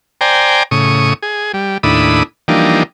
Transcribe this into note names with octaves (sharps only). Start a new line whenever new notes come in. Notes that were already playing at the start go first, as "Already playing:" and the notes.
C5 D5 G5 G#5 A#5
A2 C#3 C#6 D#6
G#4
G3
D#2 A2 D4 E4 B5 D#6
E3 F3 G3 A#3 D4 D#4